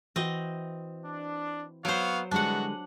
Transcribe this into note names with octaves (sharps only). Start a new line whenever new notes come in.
E3 C4 F#4 D#5 G5
D4
F#3 B3 C5 C#5 F5
D3 E3 G3 G#3 B3 D4 F#4 F#5